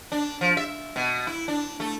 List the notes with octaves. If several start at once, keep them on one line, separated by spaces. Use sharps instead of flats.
D4
F3
E5
B2
E4
D4
A3